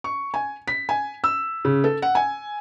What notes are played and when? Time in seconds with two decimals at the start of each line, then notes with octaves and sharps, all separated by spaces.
0.04 C#6
0.34 G#5
0.68 B6
0.89 G#5
1.24 E6
1.65 C#3
1.84 A4
2.02 F#5
2.15 G#5